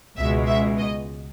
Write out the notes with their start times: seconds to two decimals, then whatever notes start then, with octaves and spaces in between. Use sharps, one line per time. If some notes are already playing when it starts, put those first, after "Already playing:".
0.17 C#2 B2 G#3 E5
0.47 E5
0.78 D#5